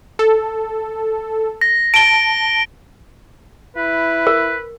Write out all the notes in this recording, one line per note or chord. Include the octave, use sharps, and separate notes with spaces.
A4
A#6
A5 D7 G7
E4 B4
A#4